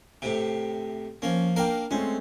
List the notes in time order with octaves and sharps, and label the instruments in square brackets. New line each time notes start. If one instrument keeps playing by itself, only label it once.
[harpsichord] A2 C3 [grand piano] D7
[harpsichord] F3 A#3 [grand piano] C#4
[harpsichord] A#3 D4 F5 [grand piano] A#4 G5
[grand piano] G#3 A3 C4 [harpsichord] C#4